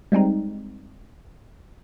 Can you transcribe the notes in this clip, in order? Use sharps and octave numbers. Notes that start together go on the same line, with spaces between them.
G3 G#3 C4 D#4